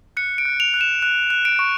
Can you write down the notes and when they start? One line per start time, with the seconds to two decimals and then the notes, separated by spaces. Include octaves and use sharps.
0.17 F#6 C#7
0.38 D7
0.45 F#6
0.60 F7
0.74 F#6
0.81 E7
1.02 F#6
1.30 F#6
1.45 D7
1.59 C#6